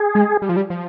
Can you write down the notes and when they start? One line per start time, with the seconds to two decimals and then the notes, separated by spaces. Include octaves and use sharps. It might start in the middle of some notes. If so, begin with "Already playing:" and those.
Already playing: G#4
0.15 G#3
0.42 G3
0.49 F3
0.56 G3
0.70 F3